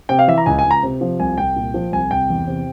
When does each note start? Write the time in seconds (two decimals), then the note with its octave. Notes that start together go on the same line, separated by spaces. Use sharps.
0.09 C3 G5
0.19 F5
0.28 E3 E5
0.38 A#5
0.46 C#2 G#5
0.59 G#5
0.65 C#2
0.71 A#5
0.83 C3
1.01 F3
1.20 C2 G#5
1.38 C2 G5
1.56 A#2
1.74 F3
1.92 C2 G#5
2.11 C2 G5
2.30 E2
2.48 C3